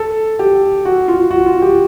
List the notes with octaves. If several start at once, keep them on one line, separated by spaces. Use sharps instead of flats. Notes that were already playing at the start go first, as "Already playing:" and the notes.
Already playing: A4
G4
F#4
F4
F#4
F4
G4